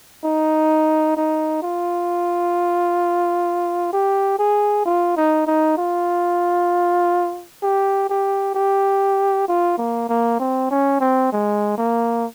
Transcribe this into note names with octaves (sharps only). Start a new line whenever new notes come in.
D#4
D#4
F4
G4
G#4
F4
D#4
D#4
F4
G4
G4
G4
F4
A#3
A#3
C4
C#4
C4
G#3
A#3